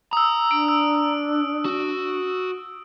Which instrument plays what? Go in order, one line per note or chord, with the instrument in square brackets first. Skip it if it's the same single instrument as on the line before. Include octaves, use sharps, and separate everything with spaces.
[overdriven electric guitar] A#5 [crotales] D#6 E6
[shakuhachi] D4 [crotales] D7
[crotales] E6
[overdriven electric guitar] F#4